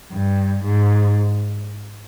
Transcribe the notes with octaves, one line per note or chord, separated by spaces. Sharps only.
G2
G#2